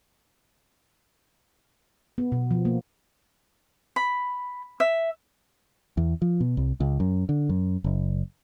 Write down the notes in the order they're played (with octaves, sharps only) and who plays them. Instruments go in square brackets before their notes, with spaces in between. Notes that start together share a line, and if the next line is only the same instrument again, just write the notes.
[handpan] B3
B2
F3
A#3
[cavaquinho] B5
E5
[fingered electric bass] E2
F3
B2
C2
C#2
F#2
D3
F#2
F#1